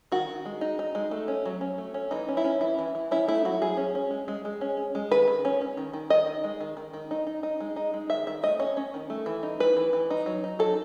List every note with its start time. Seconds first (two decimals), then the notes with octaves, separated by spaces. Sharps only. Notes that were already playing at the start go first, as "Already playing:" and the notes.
0.12 D#3 F#4
0.29 D#3
0.45 G#3
0.61 D#4
0.79 D#4
0.95 G#3
1.11 A3
1.28 C#4
1.46 F#3
1.61 C#4
1.78 A3
1.94 C#4
2.11 E3 D#4
2.28 C#4
2.37 E4
2.44 C#4
2.61 E3 E4
2.79 E3
2.95 E3
3.11 C#4 E4
3.28 A3 E4
3.45 F#3 F#4
3.61 F#3 G#4
3.77 C#4
3.95 C#4
4.11 G#3
4.28 G#3
4.45 G#3
4.61 C#4
4.77 C#4
4.95 G#3
5.11 D#3 B4
5.28 D#3
5.45 C#4
5.61 C#4
5.77 D#3
5.93 D#3
6.10 D#3 D#5
6.27 D#3
6.44 G#3
6.61 D#3
6.77 D#3
6.93 D#3
7.11 D#4
7.27 D#4
7.43 D#4
7.60 G#3
7.76 D#4
7.94 G#3
8.10 D#3 E5
8.27 D#3 E5
8.44 A3 D#5
8.60 C#4 C#5
8.77 C#4
8.94 D#3
9.10 A3
9.26 E3
9.43 D#4
9.60 E3 B4
9.77 E3
9.93 E3
10.10 D#4
10.26 F#3
10.44 D#4
10.59 F#3 A4